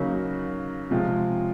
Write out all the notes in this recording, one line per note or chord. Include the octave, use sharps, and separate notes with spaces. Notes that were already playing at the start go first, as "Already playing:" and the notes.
Already playing: C#3 F#3 A#3 D#4 F#4
C3 F3 G#3 C4 F4